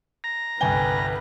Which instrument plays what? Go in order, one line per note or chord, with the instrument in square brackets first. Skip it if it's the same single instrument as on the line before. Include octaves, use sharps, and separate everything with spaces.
[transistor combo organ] A#5
[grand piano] G1 C2 G7 [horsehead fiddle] B4 [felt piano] G5 G#5